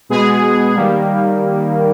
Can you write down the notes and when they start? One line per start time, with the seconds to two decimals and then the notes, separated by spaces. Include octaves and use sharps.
0.09 B2 G#3 B3 G#4
0.75 D#3 G3 A#3